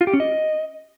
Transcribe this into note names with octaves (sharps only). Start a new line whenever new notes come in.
F4
G4
C#4
D#5